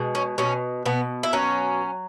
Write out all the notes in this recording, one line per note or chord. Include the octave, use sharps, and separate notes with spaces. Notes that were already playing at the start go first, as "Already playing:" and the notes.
Already playing: B2 G#3
C#4
B2 C#4
B2 B3
E4
F#3 C#4